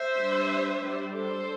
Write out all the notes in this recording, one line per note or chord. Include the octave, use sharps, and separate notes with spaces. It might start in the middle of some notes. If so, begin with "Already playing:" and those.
Already playing: C5 E5
G3 D4
G3 D4
A4 C5